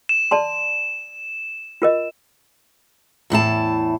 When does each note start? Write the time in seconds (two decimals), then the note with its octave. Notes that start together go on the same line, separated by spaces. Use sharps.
0.09 E7
0.31 D5 A5 C6
1.82 F4 A#4 D#5
3.30 E2 A2 E4 A5